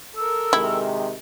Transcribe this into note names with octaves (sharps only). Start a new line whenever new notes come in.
A4 A#4 E6
C3 D#3 G#3 E4